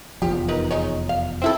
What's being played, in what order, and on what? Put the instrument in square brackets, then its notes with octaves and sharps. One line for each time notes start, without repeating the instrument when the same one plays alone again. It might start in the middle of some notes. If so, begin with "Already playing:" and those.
[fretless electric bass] F1 E2 F3 [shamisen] G4
[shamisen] D#4 A#4 B4
G#3 D#4 C#5
F5
[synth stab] C4 E4 A4